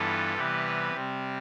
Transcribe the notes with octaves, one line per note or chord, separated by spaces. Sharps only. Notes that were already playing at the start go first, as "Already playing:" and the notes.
Already playing: G2 E3 B3 F4 A4
C3 E3 G3 B3 G4 B4
C3 G3 C4